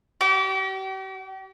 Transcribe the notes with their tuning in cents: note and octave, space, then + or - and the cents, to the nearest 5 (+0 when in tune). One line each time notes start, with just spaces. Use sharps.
G4 -40